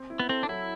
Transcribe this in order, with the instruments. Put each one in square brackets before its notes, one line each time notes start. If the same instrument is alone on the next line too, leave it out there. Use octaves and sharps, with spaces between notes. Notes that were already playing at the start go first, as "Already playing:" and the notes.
Already playing: [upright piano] C4
E4
[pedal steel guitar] B3
[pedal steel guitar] C4 [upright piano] A4
[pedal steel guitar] D4
[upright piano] F#3 [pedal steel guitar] E4